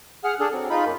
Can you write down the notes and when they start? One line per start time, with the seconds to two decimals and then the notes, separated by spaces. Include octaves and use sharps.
0.24 G#4 F#5 F6
0.40 D4 G#4 A4
0.53 F#3 C4
0.70 G#3 D#4 F4 B5
0.85 F#2 A#3